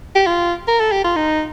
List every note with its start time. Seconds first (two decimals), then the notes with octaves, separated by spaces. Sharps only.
0.16 G4
0.26 F4
0.68 A#4
0.80 A4
0.92 G4
1.04 F4
1.16 D#4